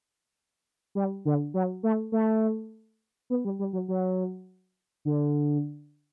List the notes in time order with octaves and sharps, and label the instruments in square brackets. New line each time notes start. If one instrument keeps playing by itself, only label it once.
[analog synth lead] G3
D3
F#3
A3
A3
B3
G3
G3
F#3
F#3
D3